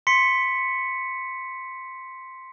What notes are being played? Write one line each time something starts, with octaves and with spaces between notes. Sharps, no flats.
C6 B6 C#7